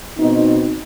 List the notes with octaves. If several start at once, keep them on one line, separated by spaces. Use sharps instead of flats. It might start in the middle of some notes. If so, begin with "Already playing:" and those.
B2 C4 D#4